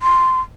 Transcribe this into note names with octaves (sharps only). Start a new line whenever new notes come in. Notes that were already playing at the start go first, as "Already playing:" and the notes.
C6